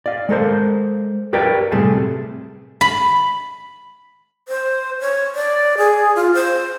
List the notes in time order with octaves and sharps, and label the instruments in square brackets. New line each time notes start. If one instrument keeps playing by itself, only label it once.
[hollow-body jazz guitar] D5 F5
G#3 A4 A#4 C5
F#4 G4 A#4 B4 D5 G5
A2 C3 G3 A3 G#4 A5
[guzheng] B5
[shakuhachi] C5
C#5
D5
G#4
F4
C5